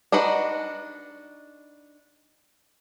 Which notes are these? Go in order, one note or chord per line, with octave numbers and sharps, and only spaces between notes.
D4 D#4 F#4 B4 F#5